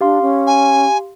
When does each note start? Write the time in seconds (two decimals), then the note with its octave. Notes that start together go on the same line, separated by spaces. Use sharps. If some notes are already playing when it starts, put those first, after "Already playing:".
0.01 D4 G4 F5 C6
0.22 C#4
0.47 G#5